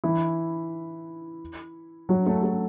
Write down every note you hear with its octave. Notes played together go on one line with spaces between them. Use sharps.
E3 E4
F#3 F#4
A3 A4
A3 A4